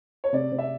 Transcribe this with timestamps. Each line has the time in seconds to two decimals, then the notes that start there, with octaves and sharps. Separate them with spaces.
0.24 C#5
0.33 C3 D5
0.52 C3
0.58 E5